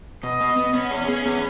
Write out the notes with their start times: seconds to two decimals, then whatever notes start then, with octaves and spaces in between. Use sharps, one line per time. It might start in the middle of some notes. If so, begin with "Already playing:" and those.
0.23 B2 D#5
0.40 B3
0.57 B3
0.74 B3 C#4
0.91 G#4
1.08 G#4
1.26 B3